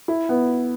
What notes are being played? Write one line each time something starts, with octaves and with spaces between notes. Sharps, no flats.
E4
B3